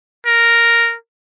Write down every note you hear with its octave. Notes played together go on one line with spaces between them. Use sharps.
A#4